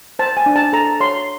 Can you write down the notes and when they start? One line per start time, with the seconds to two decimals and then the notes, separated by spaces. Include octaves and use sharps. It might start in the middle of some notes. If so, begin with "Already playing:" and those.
0.19 C5 A5
0.37 G#5
0.46 D4
0.56 A5
0.73 A4 A#5
1.00 C#5 C6